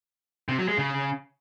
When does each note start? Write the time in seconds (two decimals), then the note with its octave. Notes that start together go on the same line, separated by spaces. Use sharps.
0.49 C3
0.59 F#3
0.68 G#3
0.78 C#3